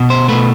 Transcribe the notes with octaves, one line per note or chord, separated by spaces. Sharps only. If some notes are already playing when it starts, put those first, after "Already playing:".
Already playing: B2
C5
B2 A3 B4